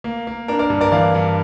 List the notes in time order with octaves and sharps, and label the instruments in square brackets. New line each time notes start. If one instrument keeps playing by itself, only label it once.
[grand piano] A#3
A#3
D4 A#4
A#4 D5
G2
A#4 D5
E3 D5 F5
G2